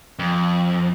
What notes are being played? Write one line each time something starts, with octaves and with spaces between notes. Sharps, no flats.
F2